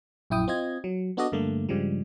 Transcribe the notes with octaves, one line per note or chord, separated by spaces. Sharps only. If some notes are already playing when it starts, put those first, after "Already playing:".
A#1 F#2 E4 G5 D#6
C4 F4 D#5 G#6
F#3
B3 D4 F#4 A4 D5 D#5
G2 D3 A3 A#3
G2 C#3 F3 G3 G#3